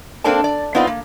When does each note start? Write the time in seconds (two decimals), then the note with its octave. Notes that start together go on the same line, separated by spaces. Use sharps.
0.24 A#3 C4 D4 A4 D5 A5
0.44 D5
0.75 B3 C4 D#4 F4 B4 D5
0.87 A#3